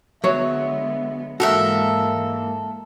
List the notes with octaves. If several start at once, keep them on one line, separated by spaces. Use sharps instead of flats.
D3 F#3 G#3 B3 C#5 E5
G#2 E3 G#3 A#3 F#4 A4 A#4 E5